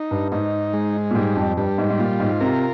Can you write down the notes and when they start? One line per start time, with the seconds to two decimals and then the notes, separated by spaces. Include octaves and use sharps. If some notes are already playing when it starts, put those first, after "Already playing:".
Already playing: D#4
0.11 G2
0.32 G#2 D#4
0.73 G#3
1.11 A#2
1.15 G#2 G3
1.36 F2
1.57 G2 G3
1.78 G#2
1.90 G#2
1.99 A#2 F4
2.20 G#2
2.41 C3 A#4